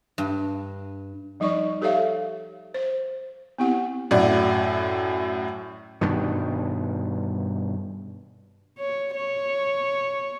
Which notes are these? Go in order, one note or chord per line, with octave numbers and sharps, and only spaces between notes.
G2
F3 G3 D#4 D5 C#6
G4 A4 C#5 E5 F5
C5
B3 C4 E4 G4 F#5
F#2 A2 F#4 D5
G2 B2 D#3
C#5
C#5